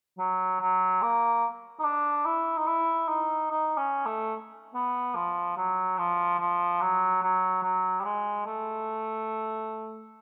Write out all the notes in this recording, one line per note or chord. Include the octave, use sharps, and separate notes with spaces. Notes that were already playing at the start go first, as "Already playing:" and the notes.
F#3
F#3
A#3
D#4
D4
E4
D#4
E4
D#4
D#4
C#4
A3
B3
F3
F#3
F3
F3
F#3
F#3
F#3
G3
G#3
A3